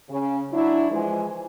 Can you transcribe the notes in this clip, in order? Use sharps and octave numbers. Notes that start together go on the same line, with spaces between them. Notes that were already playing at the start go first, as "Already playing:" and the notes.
C#3
F#3 D4 E4
E3 F3 G#3